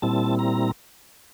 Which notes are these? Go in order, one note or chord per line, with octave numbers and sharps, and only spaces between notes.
A#2 G3 C4 E4 A5
A#5